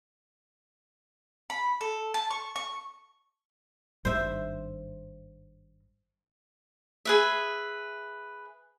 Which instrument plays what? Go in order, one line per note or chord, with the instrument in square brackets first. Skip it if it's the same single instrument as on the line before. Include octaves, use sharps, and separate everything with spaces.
[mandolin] B5
A4
A5
C#6
C#6
[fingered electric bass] G#1 G2 [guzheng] C5 E5
[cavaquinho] G#4 B4 E5